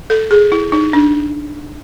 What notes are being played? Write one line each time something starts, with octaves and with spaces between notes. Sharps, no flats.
A4
G#4
E4
D#4
D4